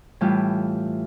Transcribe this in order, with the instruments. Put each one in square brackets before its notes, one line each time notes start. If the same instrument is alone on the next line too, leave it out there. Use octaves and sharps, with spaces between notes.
[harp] A2 E3 G3 F4 G4